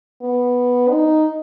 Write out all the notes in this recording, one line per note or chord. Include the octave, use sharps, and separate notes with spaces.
B3
D#4